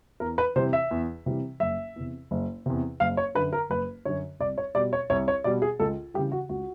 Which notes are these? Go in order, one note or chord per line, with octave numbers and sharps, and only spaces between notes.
E2 A#4
B4
C3 E3 G3 C5
E5
E2
C3 E3 G3
F#1 E5
E2 C3
F#1
E2 C3
F#1 F5
C#5
F#2 D3 B4
A#4
F#1 B4
F#2 D3 C#5
C2 D5
C#5
B2 G3 D5
C#5
C2 C#5
C#5
B2 G3 D5
G#4
C#2 A4
C#3 E3 G3 G4
F#4
C#2 F#4